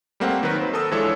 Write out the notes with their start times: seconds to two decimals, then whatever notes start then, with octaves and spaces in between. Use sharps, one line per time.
0.20 G3 A3 A#3 C4 F#5
0.43 D#3 F#3 A#4 B4
0.60 B4 C5
0.74 A4 A#4 A5 D#6 E6
0.92 E3 F3 G#3 D4 A4 C#5